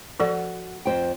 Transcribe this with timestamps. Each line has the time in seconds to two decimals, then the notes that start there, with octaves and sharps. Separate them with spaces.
0.20 F3 F#4 A4 D5
0.85 F2 C5 G5